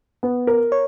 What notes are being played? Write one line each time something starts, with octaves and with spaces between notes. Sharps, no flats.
B3
A#4
C#5